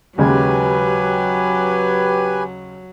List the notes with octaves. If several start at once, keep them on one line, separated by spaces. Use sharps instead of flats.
D#2 C#3 F#3 G#3 G4 B4 G#5